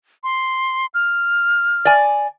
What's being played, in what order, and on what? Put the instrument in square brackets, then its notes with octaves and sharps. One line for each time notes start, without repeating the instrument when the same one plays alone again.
[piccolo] C6
F6
[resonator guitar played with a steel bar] D5 G#5